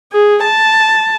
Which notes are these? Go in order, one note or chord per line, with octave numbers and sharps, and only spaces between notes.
G#4
A5